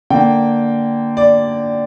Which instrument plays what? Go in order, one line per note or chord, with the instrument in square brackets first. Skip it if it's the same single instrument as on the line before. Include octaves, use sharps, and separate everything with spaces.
[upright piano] D3 A#3 G5
D5